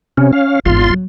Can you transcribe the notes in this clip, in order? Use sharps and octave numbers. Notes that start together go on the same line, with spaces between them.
C3 C#4
C#4 F5
G#1 E2 F4 C6
F#3